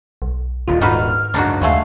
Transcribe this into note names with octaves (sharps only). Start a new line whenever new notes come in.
B1
D#1 D#2 F4
G#2 D#4 F#4 B4 F6
C#2 F#2 D4 D#4 F#4
D#2 F#3 G#3 A3 F5